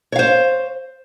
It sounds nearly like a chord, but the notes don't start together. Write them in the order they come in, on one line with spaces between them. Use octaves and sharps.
C#5 F5 C5